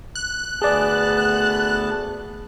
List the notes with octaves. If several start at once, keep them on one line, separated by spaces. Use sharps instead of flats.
F#6
D2 B3 G#4 D5 A5